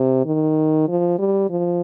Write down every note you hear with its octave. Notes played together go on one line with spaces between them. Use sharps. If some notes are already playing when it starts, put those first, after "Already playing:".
Already playing: C3
D#3
F3
G3
F3